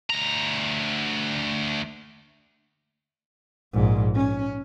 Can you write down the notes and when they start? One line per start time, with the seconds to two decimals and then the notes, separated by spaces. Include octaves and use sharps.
0.10 D2 A#5
3.74 A#1 G#2
4.15 C#4